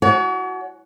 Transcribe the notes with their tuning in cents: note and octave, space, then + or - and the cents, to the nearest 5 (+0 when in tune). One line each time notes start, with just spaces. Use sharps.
F#4 +5 C#5 +45 G#5 +40